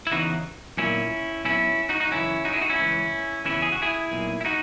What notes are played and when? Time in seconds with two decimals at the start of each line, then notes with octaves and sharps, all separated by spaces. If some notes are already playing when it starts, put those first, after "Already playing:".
0.07 E4
0.12 E2 C#3 E3 D#4 F#4
0.77 B1 A#2 C#4 E4
1.45 B1 B2 C#4 E4
1.89 D#4 F#4
2.00 D#4 F#4
2.12 F#2 C#3 E3 C#4 E4
2.45 D#4 F#4
2.53 E4 G#4
2.61 D#4 F#4
2.70 C#4 E4
2.79 C#2 C#3 E3
3.45 E2 C#3 E3 C#4 E4
3.62 G#4
3.72 F#4
3.82 E4 G#4
4.11 B1 A#2
4.41 E4
4.45 D#4 F#4